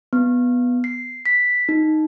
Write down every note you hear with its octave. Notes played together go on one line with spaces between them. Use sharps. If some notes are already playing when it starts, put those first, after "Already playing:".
B3
C7
B6
D#4